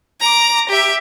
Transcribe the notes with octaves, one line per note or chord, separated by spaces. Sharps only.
A#5 D6
G4 E5